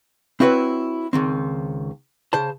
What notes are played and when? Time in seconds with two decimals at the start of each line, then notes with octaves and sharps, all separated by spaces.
0.40 C4 E4 F#4 B4 C#5
1.13 C#2 D#3 C4
2.33 C#3 C5 A5